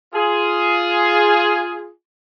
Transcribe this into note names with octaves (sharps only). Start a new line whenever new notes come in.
F4 G#4